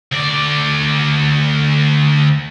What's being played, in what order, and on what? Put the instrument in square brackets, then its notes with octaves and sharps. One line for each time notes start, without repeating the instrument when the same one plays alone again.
[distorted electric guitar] D2 D5